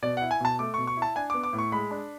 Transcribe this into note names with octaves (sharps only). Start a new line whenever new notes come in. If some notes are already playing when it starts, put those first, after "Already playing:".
B2 D5
E4 F#5
G#5
B2 A5
A3 D6
B2 C#6
C#6
E4
A5
D4 G#5
B3 D6
D6
A2
C#6
G#3 B5
D4